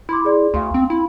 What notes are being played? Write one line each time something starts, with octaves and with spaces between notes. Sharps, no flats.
E4 B5 C6 D6
G#4 D5 C6
D2 F5 C6
C4
E4